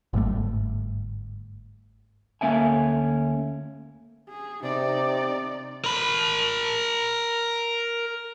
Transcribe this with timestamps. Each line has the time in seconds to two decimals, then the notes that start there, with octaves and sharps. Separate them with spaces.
0.13 G1 G#2 G3 A3
2.41 D2 A#3 C#4 E5 G#5
4.29 G#4
4.64 C3 D#4 D5
5.84 A#4 B5